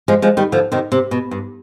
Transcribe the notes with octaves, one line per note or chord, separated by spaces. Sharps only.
F3 G#3
F3 G#3
D#3 G3
D3 F3
C3 D#3
C3
B2
G2